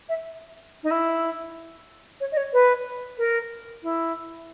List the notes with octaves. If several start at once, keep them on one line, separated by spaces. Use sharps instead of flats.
E5
D#4
E4
C#5
D#5
C#5
B4
A#4
E4